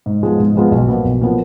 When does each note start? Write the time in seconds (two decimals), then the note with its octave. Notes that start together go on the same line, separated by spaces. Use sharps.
0.06 G#2
0.23 F3 G#3 B3 F4
0.39 G#2
0.55 F3 G#3 B3 F4
0.72 B1
0.88 A#2 F3 B3
1.04 B1
1.21 A#2 F3 B3